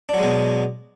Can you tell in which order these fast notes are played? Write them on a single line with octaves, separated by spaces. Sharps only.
D4 F#3 G#3 B2